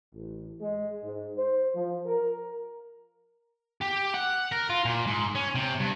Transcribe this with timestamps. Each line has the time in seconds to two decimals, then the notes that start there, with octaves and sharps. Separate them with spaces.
0.14 A1
0.61 G#3
1.03 G#2
1.37 C5
1.75 F3
2.06 A#4
3.81 G4
4.14 F#5
4.52 A#4
4.70 F4
4.85 A#2
5.07 G#2
5.35 C#4
5.55 C3
5.80 G2